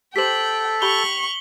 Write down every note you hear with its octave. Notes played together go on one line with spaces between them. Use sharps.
G4 A4 C5 G5 B6 F#7
G4 B5 C#6 F7 G7